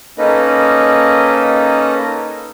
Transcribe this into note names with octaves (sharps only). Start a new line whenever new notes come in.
A#3 C#4 D#4 A4 B4 D#5